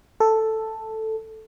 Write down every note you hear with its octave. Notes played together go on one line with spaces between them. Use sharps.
A4